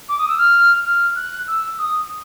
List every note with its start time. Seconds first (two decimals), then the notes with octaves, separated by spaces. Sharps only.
0.09 D6
0.18 D#6
0.28 E6
0.37 F6
0.84 F6
1.15 F#6
1.48 E6
1.78 D#6